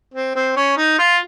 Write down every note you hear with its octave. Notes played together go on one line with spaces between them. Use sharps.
C4
C4
C#4
D#4
F4